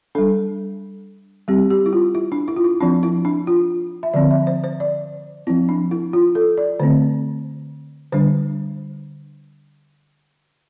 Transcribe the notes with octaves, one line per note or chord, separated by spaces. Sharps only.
G3 D4 A4
G3 C4 G4
G4
E4
F4
E4
D4
E4
F4
E4
F3 C4 D4
E4
D4
F4
E5
D3 F3 C4 D5
E5
C5
C5
D5
F3 C4 E4
D4
E4
F4
A4
D5
D3 A3 C4 C5
D3 G3 D4 C5